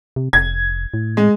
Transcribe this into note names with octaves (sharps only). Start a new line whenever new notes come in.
C3
F1 G#6
A2
G#3